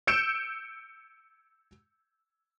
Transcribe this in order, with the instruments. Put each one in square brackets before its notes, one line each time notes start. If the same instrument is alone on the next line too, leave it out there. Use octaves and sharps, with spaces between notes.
[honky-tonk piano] E6 G6 C#7 D7 E7